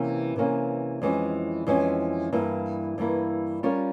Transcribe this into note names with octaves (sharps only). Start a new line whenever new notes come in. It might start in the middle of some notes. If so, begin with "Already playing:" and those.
Already playing: C3 E3 A#3 C#4
C3 E3 A#3 C#4
F2 E3 G#3 C#4
F2 E3 G#3 C#4
G2 E3 A#3 E4
G2 E3 A#3 E4
G3 C#4 F4 A#4 C#5